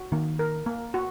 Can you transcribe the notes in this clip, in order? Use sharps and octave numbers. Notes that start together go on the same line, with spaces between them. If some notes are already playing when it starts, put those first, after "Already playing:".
Already playing: F#4
D#3 A#3
A#4
A#3
F#4